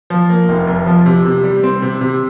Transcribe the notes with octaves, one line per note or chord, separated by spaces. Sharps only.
F3
A#3
F1
F2
F3
C3
C3
G3
C4
C3
C3